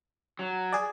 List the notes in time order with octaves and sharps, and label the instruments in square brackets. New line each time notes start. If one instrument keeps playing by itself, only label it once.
[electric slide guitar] F#3
[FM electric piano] G#4 D5